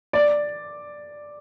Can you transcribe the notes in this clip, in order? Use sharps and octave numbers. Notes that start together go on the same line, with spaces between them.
D5